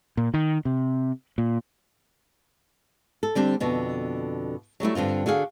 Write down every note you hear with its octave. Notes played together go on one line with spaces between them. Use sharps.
A#2
D#3
C3
A#2
A4
D3 G3 C4 D4
F2 B2 D3
F#3 G3 A3 E4
G2 D3 C4 F4
D3 F#4 G#4 F5